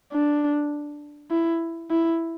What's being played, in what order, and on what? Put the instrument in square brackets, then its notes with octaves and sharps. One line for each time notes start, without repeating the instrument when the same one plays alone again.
[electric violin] D4
E4
E4